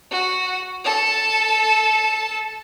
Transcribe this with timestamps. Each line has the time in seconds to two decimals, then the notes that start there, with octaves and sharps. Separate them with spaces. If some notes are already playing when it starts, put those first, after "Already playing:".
0.11 F#4
0.84 A4 A5